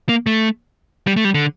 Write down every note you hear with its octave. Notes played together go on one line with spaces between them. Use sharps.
A#3
A3
G3
A3
G3
D3